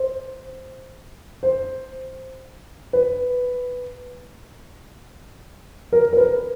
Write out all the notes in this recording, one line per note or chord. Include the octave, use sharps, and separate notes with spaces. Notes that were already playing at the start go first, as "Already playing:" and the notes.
Already playing: C5
C5
B4
A#4
A#4
B4